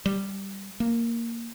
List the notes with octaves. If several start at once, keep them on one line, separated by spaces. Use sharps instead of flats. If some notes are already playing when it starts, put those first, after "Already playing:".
G3
A#3